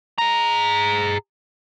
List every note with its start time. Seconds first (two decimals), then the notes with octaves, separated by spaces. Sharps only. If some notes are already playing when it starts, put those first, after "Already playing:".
0.18 G#4 A#5